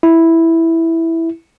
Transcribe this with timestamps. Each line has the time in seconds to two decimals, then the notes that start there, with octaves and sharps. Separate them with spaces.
0.03 E4